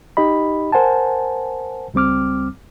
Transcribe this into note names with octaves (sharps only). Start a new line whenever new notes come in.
D#4 G4 D#5 B5
A#4 C5 F#5 G#5 A5
C#2 G3 C4 D6 F6